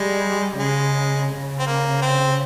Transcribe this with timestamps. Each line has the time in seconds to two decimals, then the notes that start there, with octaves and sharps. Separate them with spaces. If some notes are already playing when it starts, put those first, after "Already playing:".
Already playing: G3 G#3
0.57 C#3 G#3
1.30 C#3
1.59 C4
1.66 A#3
2.02 C4